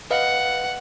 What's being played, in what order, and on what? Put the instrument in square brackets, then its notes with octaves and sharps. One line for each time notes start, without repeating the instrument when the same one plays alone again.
[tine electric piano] B4 D#5 F5 [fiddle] F#5